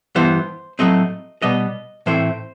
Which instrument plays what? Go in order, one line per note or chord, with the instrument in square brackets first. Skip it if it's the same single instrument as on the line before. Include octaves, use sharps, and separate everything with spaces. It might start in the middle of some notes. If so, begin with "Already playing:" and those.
[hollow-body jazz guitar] G2 E3 B3 C5
A2 F#3 A3 C4 D#5
B2 G3 B3 D#5
A2 E3 A3 C4 C5